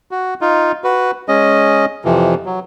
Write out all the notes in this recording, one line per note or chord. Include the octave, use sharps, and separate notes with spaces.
F#4
D#4 F4
F#4 B4
G#3 C#4 D#5
F2 C3 E3 F3
F#3